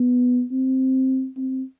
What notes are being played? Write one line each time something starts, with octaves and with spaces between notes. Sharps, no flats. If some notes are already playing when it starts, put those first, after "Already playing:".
Already playing: B3
C4
C4